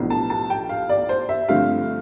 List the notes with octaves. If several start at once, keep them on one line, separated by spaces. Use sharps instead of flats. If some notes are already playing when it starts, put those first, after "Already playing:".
Already playing: B1 A2 F3 B3 D4
A5
A5
G5
F5
D5
C5
E5
G2 D3 F3 A3 C4 F5